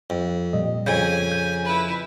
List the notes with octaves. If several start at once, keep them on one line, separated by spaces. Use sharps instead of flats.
F2
A#2 G3 D#5
F2 C#3 G#5 G6 G#6
G6
E4 B4